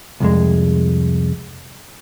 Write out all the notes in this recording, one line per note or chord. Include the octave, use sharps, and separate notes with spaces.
C2 F2 G#3